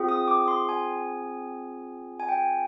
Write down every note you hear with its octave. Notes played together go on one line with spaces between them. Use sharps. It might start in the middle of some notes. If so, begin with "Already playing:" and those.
Already playing: C4 F4 G#4
D#6
D6
C6
G#5
G#5
G5